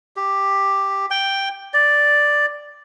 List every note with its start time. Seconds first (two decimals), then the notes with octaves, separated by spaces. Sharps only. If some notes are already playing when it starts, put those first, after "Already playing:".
0.16 G4
1.11 G5
1.74 D5